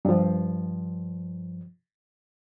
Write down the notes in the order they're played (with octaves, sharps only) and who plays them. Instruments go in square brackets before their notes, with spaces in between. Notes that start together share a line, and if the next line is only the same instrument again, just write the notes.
[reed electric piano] G2 F3